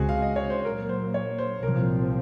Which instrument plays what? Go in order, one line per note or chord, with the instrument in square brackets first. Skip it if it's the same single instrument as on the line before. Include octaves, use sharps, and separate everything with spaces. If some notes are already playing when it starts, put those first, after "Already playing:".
Already playing: [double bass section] C#2 C#3 G#3 C4 [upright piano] F#4 G#4
[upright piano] F5
D#5
C#5
C5
[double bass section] A#2 F#3 A#3 [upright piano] A#4
[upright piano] C5
C#5
C5
[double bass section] C2 A#2 F3 C4 [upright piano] A#4